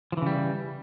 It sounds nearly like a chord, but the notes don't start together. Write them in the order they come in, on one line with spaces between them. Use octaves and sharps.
F3 E3 C#3 G3